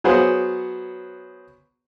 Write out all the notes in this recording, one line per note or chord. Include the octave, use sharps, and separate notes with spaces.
F#3 B3 G#4 C5 F#5